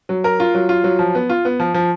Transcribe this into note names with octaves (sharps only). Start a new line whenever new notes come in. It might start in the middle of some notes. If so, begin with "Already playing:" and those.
F#3
A#4
F4
F#3
F4
F#3
F3
B3
F4
B3
F3
F3